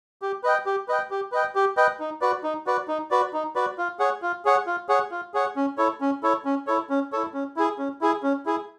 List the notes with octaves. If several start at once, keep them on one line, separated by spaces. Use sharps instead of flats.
G4
B4 D#5 G5
G4
B4 D#5 G5
G4
B4 D#5 G5
G4
B4 D#5 G5
D#4
F#4 B4 D5
D#4
F#4 B4 D5
D#4
F#4 B4 D5
D#4
F#4 B4 D5
F4
G#4 C#5 F#5
F4
G#4 C#5 F#5
F4
G#4 C#5 F#5
F4
G#4 C#5 F#5
C#4
E4 A4 C#5
C#4
E4 A4 C#5
C#4
E4 A4 C#5
C#4
E4 A4 C#5
C#4
E4 G#4
C#4
E4 G#4
C#4
E4 G#4